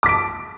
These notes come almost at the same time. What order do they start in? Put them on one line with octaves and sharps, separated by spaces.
D6 B6 D7 A5